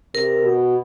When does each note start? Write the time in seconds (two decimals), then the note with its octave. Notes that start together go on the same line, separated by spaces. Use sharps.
0.15 C3 A#4
0.45 B2